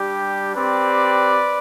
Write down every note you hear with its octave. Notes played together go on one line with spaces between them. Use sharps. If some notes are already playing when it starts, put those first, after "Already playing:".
Already playing: G3 D4 G4
C4 G4 B4 D5